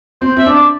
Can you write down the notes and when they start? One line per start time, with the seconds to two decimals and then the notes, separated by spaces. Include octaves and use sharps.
0.21 C4 C5
0.37 C4 E5
0.46 D4
0.55 D5